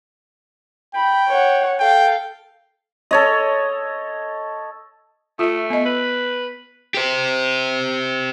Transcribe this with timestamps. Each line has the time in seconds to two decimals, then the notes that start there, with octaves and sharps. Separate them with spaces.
0.95 G5 B5
1.28 C#5 F#5
1.79 A4 F5 G5
3.11 A4 C#5 D#5
5.39 A3 F4 E5
5.70 B3 D#5
5.85 B4
6.94 G4 C5